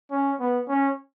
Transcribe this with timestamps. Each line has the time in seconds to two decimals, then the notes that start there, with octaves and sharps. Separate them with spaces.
0.11 C#4
0.40 B3
0.68 C#4